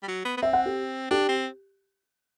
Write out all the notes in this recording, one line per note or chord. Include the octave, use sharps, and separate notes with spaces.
G3
F#3
B3
B3
C4 E5
F#5
G4
D4 G4
C4